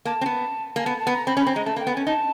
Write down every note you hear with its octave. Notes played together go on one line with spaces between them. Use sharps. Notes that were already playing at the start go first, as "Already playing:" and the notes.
A#3 A5
C4
B3
A#3 G#5
B3 A5
A5
B3
A#5
C4 B5
C#4
B5
C4
G#3 A#5
A3 A5
A#3
G5
B3
C#4 G#5
D#4 A5